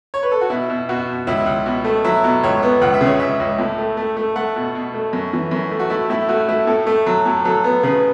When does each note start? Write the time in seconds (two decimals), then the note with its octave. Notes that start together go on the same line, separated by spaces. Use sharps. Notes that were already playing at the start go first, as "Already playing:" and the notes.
0.14 C#5
0.23 B4
0.32 A4
0.41 F#4
0.50 B2 E4
0.69 B2
0.89 B2 F#4
1.08 B2
1.27 C#2 E4
1.46 C#2
1.66 B2
1.85 A3
2.04 F#3 E4
2.24 B2
2.43 C#2 C#5
2.63 B3
2.81 C#2 F#5
2.94 E5
3.01 C#3
3.06 C#5
3.19 C#2 E5
3.40 C#2
3.58 A2
3.78 A3
3.97 A3
4.17 A3
4.36 A3 F#5
4.56 B2
4.75 B2
4.94 A3
5.13 F#2
5.33 E3
5.51 F#2
5.71 A3
5.80 F#4
5.90 A3 E4
6.10 A2 E4
6.29 A3 F#4
6.48 A3 E4
6.67 A2 A4
6.87 A3
7.06 F#3
7.26 A2
7.45 F#3 A4
7.64 B3
7.83 C#3 B4